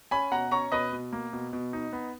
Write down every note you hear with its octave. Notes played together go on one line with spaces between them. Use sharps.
C#4 G#5 B5
B2 F#5 A#5
C#4 A#5 C#6
B2 B4 D#5
B2
A#3
B2
B2
D#4
B3